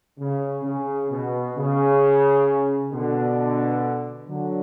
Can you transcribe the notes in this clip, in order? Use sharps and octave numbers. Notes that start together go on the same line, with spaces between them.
C#3
C#3
B2
C#3
B2 D3
D3 F#3